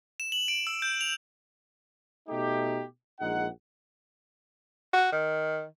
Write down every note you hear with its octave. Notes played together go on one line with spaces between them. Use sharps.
E7
F#7
D7
E6
G6
F7
B2 A3 D#4 G4
A#1 G#3 D#4 F#5
F#4
D#3